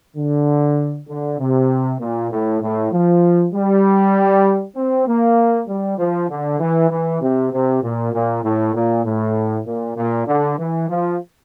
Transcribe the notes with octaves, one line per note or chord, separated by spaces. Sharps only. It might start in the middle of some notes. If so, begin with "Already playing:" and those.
D3
D3
C3
A#2
A2
A2
F3
G3
C4
A#3
G3
F3
D3
E3
E3
C3
C3
A#2
A#2
A2
A#2
A2
A#2
A#2
D3
E3
F3